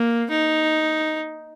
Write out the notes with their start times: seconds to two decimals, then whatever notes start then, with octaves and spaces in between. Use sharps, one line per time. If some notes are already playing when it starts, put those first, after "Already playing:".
Already playing: A#3
0.31 D#4